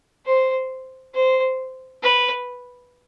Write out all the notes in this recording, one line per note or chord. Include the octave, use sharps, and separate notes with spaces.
C5
C5
B4